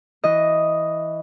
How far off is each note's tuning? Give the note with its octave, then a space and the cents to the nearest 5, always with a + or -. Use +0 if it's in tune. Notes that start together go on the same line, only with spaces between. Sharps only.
E3 -5 D#5 +0